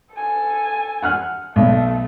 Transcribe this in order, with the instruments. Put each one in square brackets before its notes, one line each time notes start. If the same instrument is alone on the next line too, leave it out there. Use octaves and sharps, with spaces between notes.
[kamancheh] A4 G#5
[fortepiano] F#5 F6 F#6
[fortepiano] B1 [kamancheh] A3